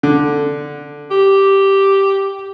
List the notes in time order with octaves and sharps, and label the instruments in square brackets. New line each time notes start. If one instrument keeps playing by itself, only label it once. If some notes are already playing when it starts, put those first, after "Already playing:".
[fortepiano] D3
[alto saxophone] G4